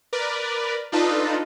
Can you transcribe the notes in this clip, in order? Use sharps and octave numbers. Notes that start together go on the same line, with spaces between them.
A#4 B4 D5
D4 D#4 F4 A4 B4 D#5